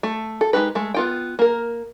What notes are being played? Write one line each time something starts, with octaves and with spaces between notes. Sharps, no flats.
A3
A4
G#3 A#3 D#4 G4 B4
G#3 A3
B3 F4 G5
A#3 A#4